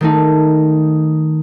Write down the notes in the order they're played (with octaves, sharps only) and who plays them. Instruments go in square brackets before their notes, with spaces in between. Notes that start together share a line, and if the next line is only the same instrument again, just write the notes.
[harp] D#3 A3 D#4